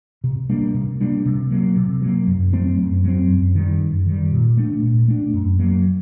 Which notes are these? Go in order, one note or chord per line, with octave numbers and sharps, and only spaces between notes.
C3
G3 A#3 D4
C3
G3 A#3 D4
C3
F#3 A#3
C3
F#3 A#3
F#2
F#3 A3 C4
F#2
F#3 A3 C4
F#2
D#3 G3
F#2
D#3 G3
A#2
A3 D4
A#2
A3 D4
F#2
F#3 A#3